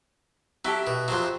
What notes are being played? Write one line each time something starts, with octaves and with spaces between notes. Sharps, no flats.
F#3 E4 G4 A4
B2
F2 C3 F#3 C5